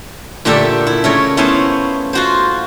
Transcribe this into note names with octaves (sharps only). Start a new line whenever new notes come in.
A#2 D3 A3 D4 G4 A4
E4
C#3 A3 A#4 C#5
A3 B3 C#4 E4 C5 F5
F4 F#4 C5